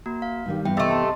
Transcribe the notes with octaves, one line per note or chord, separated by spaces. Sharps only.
A#3 F#4 A#5
F5
G2 D#3 G3
E2 G2 G5
C3 A3 D#5 A6
A5 C6